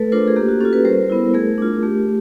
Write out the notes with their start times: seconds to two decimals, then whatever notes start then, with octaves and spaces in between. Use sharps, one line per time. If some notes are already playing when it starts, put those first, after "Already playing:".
Already playing: A3 A4 B4
0.12 D4 F4 A#4 C5
0.28 G#4
0.36 A#3 G4
0.49 F#4
0.60 C#4 G4 A4
0.65 F4
0.73 A4 B4
0.85 G3 A#4 C5
1.10 B3 E4
1.34 A3 G#4 A#4
1.58 D4 F4
1.83 A3 G4